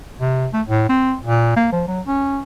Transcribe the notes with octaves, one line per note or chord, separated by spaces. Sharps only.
C3
A3
A2
C4
A#2
A#3
F3
F#3
C#4